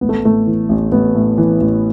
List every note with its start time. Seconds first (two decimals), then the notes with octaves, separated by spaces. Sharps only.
0.01 A1 B3
0.09 A3
0.24 A2 A3
0.47 E3
0.69 A1
0.92 A1 B3
1.16 A2
1.38 E3
1.60 A1